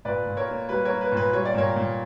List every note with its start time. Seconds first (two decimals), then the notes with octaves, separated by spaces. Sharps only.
0.05 A#2 B4 D5
0.26 A#2
0.37 A#4 C#5
0.48 A#3
0.69 G3 B4
0.85 A#3 A#4 C#5
1.01 B4
1.12 A#2
1.17 B4
1.33 G3 C#5
1.45 D5
1.54 A#2 A#4 C#5
1.76 A#2